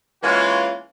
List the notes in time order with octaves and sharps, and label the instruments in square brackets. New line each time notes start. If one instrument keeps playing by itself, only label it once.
[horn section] E3 G#3 A#3 C#4 F4 F#4